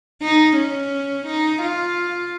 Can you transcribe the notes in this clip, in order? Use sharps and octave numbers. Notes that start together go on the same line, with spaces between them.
D#4
C#4
D#4
F4